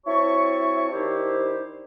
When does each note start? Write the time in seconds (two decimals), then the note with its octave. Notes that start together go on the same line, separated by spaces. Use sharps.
0.06 C4 E4 F#4 C#5 A5 C#6
0.91 D#3 D4 E4 G4 C5